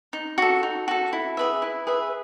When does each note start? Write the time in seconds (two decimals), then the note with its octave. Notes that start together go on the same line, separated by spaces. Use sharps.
0.13 D#4
0.38 F#4 A4
0.63 D#4
0.88 F#4 A4
1.13 E4
1.37 G#4 B4 E5
1.62 E4
1.87 G#4 B4 E5